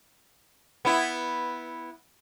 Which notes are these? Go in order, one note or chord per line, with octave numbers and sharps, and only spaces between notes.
B3 E4